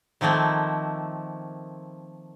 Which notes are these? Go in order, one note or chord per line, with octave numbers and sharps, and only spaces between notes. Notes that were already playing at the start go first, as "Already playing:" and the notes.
D#3 F3 A3 A#3 C4